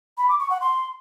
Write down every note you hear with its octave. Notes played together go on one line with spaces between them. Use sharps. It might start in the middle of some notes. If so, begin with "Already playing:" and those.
B5
D6
C#6
F#5
C6